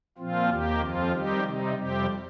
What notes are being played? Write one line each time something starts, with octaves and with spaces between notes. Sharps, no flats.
A#2 F3 C4 F4
D#2 D#3 A#3 G4
F2 F3 C4 F4
D#3 G3 C4 D#4 G4
C3 G3 C4 D#4
F2 C3 G3 C4 G4